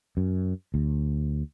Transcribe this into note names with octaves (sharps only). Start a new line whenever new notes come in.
F#2
D2